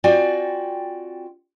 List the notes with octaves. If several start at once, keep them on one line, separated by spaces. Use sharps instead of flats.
C4 F4 F#4 D5 G5 G#5